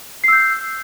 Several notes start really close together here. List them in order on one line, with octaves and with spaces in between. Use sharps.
C7 E6 G6